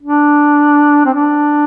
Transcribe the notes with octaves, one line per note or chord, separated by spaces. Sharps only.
D4
C4
D4